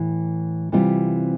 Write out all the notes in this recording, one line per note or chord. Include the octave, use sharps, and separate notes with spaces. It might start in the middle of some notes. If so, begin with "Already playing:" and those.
Already playing: A2 E3
C3 E3 G3 C4 F4